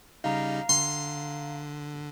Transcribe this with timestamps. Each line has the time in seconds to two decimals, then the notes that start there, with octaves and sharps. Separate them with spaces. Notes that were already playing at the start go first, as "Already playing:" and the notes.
0.24 C#3 G3 D#4 F5 A#5
0.69 D3 C6